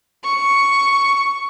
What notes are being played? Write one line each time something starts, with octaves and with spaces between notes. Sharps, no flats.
C#6